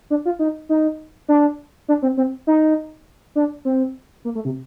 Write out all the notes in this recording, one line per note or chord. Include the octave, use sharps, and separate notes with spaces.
D4
F4
D#4
D#4
D4
D4
C4
C4
D#4
D4
C4
A#3
A3
C3